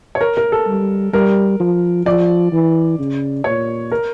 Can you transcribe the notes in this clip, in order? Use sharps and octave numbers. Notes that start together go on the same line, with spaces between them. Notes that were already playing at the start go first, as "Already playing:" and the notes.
C#5
A#4
A#4
A4
G3
G3 A#4
F3
F3 D5
E3
C#3
A#2 C#5
A#4